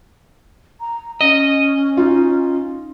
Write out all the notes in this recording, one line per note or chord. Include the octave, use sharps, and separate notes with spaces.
A#5
C#4 D#5
D#4 F4